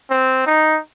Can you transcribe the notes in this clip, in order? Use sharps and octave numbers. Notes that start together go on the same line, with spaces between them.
C4
D#4